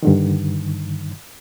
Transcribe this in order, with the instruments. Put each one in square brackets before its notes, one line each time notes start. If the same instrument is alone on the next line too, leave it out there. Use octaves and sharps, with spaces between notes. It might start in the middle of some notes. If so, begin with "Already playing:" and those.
[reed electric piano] G2 D3 D#3